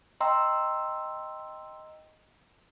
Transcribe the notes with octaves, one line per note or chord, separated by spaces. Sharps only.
D#5 G5 A#5 C6 E6